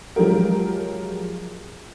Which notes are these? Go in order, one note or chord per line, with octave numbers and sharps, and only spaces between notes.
F3 F#3 G#3 G4 A#4